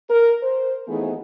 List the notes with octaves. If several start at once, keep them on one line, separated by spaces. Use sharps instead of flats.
A#4
C5
D#2 E3 A3 B3 D#4 G#4